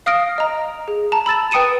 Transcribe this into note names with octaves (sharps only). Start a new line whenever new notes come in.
F5 D#6 F6 A#6 D7
D#5 A#5
G#4
A5 A#5
B5 E6 A6 E7
B4 G5 D#6 C#7 D#7 E7